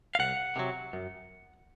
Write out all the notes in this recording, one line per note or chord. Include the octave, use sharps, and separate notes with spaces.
F5
C2 F#5
C3 D#3 F#3
F#2